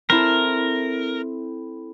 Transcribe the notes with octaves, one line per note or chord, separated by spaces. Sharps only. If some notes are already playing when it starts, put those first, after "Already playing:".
C4 E4 A4 A#4